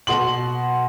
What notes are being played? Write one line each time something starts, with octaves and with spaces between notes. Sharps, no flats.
B2 F#4 C6 F#7